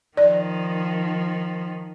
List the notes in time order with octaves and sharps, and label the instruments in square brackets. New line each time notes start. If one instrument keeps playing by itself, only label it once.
[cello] D#3 F3 [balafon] D5